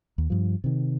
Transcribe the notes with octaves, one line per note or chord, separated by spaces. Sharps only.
D#2
G2 F3
C3 D#3